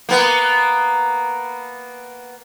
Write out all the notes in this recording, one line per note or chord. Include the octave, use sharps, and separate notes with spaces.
A#3 B3